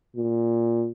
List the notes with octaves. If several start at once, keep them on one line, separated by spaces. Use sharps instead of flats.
A#2